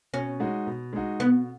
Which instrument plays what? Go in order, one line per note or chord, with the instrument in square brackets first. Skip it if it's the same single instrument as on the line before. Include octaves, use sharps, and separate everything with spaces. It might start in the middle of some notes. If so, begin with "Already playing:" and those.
[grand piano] B2 [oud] C#4
[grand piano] G#3 D#4 F#4
B2
G#3 D#4 F#4
[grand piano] B2 [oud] B3